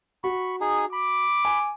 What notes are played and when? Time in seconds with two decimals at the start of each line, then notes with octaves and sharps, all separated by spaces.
0.24 F#4 B5 C#6
0.61 D#4 G#4
0.93 B5 D6
1.45 G#5